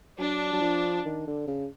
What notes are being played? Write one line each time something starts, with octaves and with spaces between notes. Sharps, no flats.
F#3 D4
F#3
F3
D#3
D3
C#3